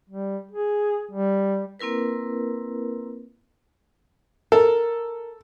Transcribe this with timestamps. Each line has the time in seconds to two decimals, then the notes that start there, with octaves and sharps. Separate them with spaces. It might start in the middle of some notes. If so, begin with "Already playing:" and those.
0.10 G3
0.51 G#4
1.11 G3
1.80 A#3 C4 E4 A#4 B4
4.52 A4 A#4